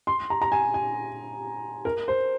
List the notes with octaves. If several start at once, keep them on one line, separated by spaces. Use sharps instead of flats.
C6
A#5
A#5
G#5
G#5
A#4
C5